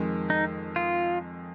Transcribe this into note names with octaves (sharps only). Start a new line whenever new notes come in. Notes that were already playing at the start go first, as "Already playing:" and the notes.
Already playing: F2 D#3 G#3
D#4
F4